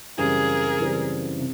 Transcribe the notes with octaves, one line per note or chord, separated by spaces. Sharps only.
F#2 C#3 E3 G3 C4 G#4 A#4
F#2 C#3 E3 G3 C4
C3